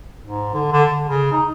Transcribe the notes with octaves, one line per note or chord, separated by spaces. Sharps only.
G#2
D3
D3
D3
C#3
D#4